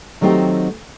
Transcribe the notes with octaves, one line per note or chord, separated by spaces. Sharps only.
D#3 F#3 A3 C4 D#4 G4